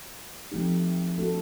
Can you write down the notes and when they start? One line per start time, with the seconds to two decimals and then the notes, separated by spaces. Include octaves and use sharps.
0.52 F3 A3 C4 D#4 G4
1.18 A3 D4 F#4 A4